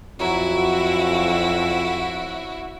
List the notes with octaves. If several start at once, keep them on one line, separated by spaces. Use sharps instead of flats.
F2 F#3 E4 F#4 G#5 A#5